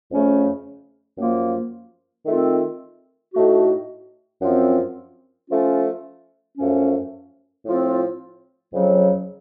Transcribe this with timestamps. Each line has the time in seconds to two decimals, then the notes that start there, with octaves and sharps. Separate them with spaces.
0.10 F2 C#3 A3 C#4
1.18 F#2 F3 A#3
2.26 D#3 A3 C4 F4
3.34 A2 A3 D#4 F#4
4.42 F#2 F3 C4
5.50 F3 A3 C#4 F4
6.58 F#2 F3 A3 C#4
7.66 A2 F3 C4 F4
8.73 F2 C#3 F#3